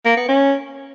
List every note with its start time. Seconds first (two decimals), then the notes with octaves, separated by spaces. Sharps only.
0.06 A#3
0.17 B3
0.29 C#4